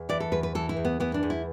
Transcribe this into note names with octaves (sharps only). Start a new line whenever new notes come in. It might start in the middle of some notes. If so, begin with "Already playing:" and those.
Already playing: E2
E3 D5
A4
E2 B4
B4
E3 A4
E4
E2
B3
E3 B3
D4
E2
E4